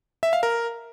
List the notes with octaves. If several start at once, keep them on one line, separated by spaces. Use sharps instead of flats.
E5
F5
A#4